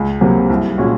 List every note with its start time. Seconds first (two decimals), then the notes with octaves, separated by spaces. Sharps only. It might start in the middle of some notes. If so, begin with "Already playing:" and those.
Already playing: C#2
0.21 C3 F#3 A#3
0.49 C2
0.78 A#2 G#3 C#4 F#4